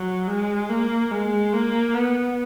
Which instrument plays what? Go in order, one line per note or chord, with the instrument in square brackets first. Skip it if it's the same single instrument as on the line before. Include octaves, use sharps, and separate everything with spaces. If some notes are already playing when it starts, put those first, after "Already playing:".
Already playing: [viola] F#3
G#3
A#3
G#3
A#3
B3